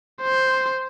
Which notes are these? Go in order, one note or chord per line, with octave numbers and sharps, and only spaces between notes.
C5